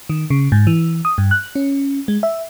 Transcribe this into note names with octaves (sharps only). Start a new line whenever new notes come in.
D#3
C#3
G#2
E3
D#6
G2
F#6
C#4
G#3
E5